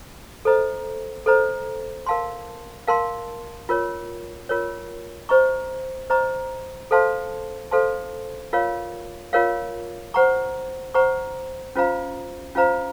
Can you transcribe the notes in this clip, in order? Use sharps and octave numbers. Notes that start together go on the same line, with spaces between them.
A4 C5 D#5 A#5
A4 C5 D#5 A#5
A#4 F5 A5 C6
A#4 F5 A5 C6
F4 A#4 C#5
F4 A#4 C#5
C5 D#5 A#5 C#6
C5 D#5 A#5 C#6
A4 C5 F5 A5 C6
A4 C5 F5 A5 C6
F4 A#4 C#5 F5
F4 A#4 C#5 F5
C5 F#5 A#5 C#6
C5 F#5 A#5 C#6
C#4 F4 C5 F5 A#5
C#4 F4 C5 F5 A#5